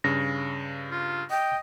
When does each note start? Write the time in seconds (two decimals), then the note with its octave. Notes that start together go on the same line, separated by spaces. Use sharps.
0.04 G2 C#3 A#6
0.91 F4
1.31 D#5 G5